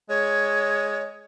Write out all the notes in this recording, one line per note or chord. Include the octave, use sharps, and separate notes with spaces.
G#3 C#5